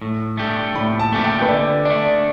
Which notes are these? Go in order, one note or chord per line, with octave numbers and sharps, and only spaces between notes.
A2
A3 D4 G4
A2 B5
A5
A3 D4 G4 A5
G5
B4
D3 D5
A3 D4 D5